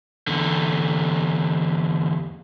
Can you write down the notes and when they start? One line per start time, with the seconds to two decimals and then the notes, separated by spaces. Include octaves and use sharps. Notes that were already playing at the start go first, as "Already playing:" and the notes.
0.27 E2 D3